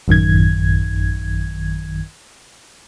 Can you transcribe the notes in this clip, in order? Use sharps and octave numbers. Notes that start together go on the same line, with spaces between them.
A1 F#2 D#3 G#6